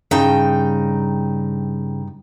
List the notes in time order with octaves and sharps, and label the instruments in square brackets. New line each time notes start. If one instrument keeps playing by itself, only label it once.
[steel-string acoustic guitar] G2 D#4 G5 [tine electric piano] C#3